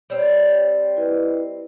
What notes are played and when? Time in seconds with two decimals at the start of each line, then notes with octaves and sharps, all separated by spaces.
0.10 G3 C4 C5 C#5
0.97 E4 B4 D#5